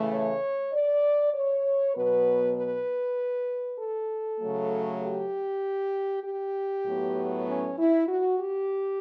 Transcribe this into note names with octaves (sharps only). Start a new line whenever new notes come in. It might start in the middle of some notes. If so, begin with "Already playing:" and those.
Already playing: C#3 E3 A3
C#5
D5
C#5
B2 F#3 B3 B4
B4
A4
C#3 F#3 A3
G4
G4
A2 F#3 B3
C#4
E4
F#4
G4